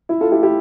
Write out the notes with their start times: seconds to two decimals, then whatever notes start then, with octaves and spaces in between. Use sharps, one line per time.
0.09 E4
0.21 F4 A4
0.32 E4 G4
0.43 E4 G4